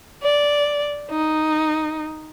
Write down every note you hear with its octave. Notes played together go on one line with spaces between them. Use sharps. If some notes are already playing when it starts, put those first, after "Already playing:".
D5
D#4